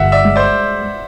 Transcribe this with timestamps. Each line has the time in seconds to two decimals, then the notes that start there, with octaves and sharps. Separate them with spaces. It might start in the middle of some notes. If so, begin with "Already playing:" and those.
Already playing: G1 E5 F#5
0.12 D5 E5
0.25 G#3
0.36 C5 D5